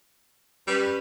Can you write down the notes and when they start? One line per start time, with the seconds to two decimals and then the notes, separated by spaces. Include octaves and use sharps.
0.68 G3 C#4 B4